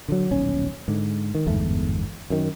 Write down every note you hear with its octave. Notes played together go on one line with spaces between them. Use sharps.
D3 D#3 F#3
D#1 B1 C#4
G#2 D3
D#3
G1 E2 G#2 A3
F#2 D#3